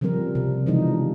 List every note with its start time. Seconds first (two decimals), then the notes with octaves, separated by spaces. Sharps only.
0.01 C#3 F3 G3 C4 A#4
0.35 C3
0.66 C#3 E3 F3 G#3 D#4